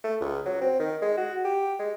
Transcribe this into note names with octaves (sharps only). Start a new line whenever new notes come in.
A3
C#2
F#3
C4
D#3
G#3
F#4
G4
G#3